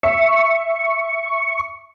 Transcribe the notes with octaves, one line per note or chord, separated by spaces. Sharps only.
E5 C#6